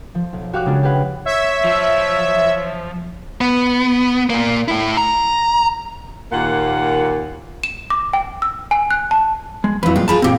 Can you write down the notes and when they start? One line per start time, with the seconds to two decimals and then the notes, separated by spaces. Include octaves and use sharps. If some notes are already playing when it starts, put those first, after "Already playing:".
0.15 F3
0.33 B1
0.53 F#4 G4 F5 C#6 D6 F#6
0.66 C#3 G#3 D4 F4 G#4
0.83 G4 G#4 B4 F#5 G5
1.26 C#5 E5
1.65 F3
3.41 B3
4.30 A#2 A#3
4.68 A2 E4
4.97 A#5
6.31 D#2 A#2 A#3 F#5
7.64 E7
7.90 D6
8.13 G5
8.42 E6
8.71 G#5
8.91 F#6
9.11 A5
9.64 G#3
9.83 F2 F#3 E4 B4
9.96 A#2 G3 G#3 F4
10.08 F4 G#4 A#4 A5 B5
10.22 G2 A#2 C4 G4 G5